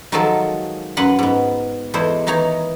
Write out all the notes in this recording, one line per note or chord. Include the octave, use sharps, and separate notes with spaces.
D#3 F3 F#3 G#3 F4 A4
F#2 B4 F#5 C6
G#2 B3
E2 G#3 E4 A4 C5
D#3 E3 D#4 C#5 A#5